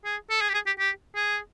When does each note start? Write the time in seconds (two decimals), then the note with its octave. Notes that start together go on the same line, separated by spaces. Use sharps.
0.05 G#4
0.30 A4
0.41 G#4
0.49 G4
0.54 G#4
0.66 G4
0.79 G4
1.15 G#4